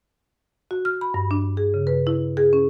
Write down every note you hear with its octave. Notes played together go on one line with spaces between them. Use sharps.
F#4
F6
B5
G2
D4
G#4
C#3
B4
E4
G#4
C#4